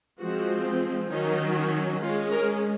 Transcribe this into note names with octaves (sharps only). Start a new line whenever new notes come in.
F3 G#3 C4 F#4
D#3 F#3 C#4 D#4
G#3 C#4 F4
A#4